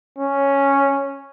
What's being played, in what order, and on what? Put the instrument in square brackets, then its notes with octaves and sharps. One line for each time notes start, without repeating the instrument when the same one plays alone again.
[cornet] C#4